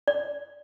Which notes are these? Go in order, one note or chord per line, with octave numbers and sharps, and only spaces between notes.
D5